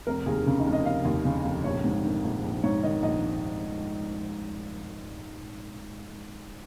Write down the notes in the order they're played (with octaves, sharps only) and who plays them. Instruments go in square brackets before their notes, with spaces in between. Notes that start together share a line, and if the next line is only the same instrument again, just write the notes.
[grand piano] F1 A#4
D#2 G#4
C#3 C#4
D#4
F1
D#5
F1 F5
D#2
C#3
F1
A#1 C#5
G#2
D#3
A#1
A#1
G#2 C#5
D#3 D#5
A#1 D#5